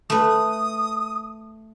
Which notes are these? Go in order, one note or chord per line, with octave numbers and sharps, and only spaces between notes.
A3 B4 D#6